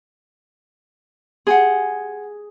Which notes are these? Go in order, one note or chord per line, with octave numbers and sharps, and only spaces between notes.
G#4 F#5 G5 C6